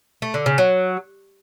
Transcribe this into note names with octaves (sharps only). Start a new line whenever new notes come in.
A3
D3
C#3
F#3